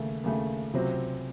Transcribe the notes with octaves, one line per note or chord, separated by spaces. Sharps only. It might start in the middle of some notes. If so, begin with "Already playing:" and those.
Already playing: D#2 C#3 A3
D#2 C#3 A3
C#2 C3 F#3 C4